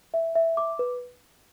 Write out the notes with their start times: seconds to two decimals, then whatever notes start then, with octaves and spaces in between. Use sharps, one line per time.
0.14 E5
0.35 E5
0.57 D6
0.79 B4